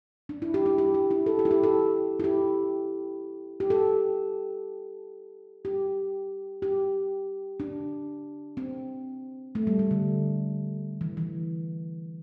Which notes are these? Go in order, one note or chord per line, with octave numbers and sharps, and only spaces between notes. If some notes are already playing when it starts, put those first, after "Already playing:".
D4
E4
G4
E4
G4
G4
E4
A4
G4
E4
G4
A4
E4
G4
G4
A4
G4
G4
D4
C4
A3
G3
G3
D3
E3
E3